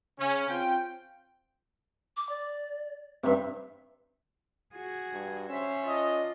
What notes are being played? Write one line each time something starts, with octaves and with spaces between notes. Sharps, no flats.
C#3 C#4
C4 F4 G5
D6
D5
G2 C3 E5
F#4 G#4
G2
C#4 C5 E5
D4 F4 D#5